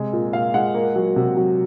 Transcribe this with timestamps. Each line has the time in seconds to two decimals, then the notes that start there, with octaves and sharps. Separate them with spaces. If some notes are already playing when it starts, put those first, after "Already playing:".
Already playing: C3 G#3
0.13 A#2
0.33 A#2 F5
0.54 G#3 F#5
0.74 A#3
0.96 F#3
1.16 C3
1.37 F#3